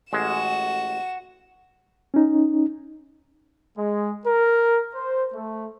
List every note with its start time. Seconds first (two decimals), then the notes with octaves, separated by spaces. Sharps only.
0.13 A1 G#3 F#4 E7
2.14 C#4 D#4
3.78 G#3
4.26 A#4
4.94 C5
5.34 A3